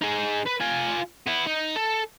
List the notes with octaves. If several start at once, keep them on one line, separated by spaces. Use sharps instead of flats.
D#4 G#4
B4
F4 G#5
B3 E4
D#4
A4